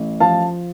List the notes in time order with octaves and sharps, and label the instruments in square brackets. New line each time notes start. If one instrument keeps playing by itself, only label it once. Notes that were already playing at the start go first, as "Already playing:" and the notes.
Already playing: [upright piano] A1
F3 F5 A5